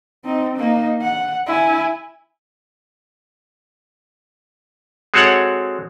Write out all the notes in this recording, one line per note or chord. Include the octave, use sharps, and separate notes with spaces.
C4 D#4
A#3 D#4
F#5
E4 G#5
G#3 C4 F#4 A4 C#5 F#5